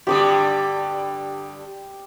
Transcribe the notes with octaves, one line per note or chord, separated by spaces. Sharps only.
G2 D3 G3 G4 D6 D#6